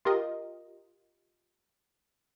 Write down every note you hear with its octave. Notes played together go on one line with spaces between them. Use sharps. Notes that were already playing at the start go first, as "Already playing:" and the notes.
F4 G4 A#4 D#5